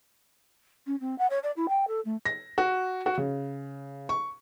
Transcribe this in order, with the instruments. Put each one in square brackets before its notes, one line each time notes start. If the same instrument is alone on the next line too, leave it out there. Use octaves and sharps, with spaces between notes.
[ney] C#4
C4
F#5
C#5
D5
E4
G5
A4
A3
[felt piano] A#6
F#4
F#4
C#3
C#6